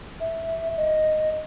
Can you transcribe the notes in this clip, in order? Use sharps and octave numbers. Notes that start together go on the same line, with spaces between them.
E5
D#5